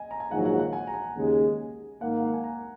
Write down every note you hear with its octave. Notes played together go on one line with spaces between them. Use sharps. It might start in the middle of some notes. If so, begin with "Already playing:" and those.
Already playing: D#5 G#5
A#5
G#5
A#1 G#2 D#3 F#3 F#5
F#5
F#5
G#5
A#5
G#5
D#2 C#3 G#3
G#2 D#3 A#3 F#5
F5
F5
G#5
A#5